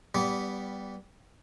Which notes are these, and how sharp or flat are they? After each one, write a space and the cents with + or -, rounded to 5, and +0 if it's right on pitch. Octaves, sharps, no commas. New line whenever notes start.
G3 +0 B3 +0 D5 -25